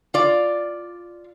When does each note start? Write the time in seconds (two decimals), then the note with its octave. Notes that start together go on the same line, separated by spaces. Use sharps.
0.14 F4 D5